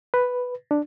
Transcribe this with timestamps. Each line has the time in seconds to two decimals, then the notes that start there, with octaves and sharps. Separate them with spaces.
0.14 B4
0.71 D4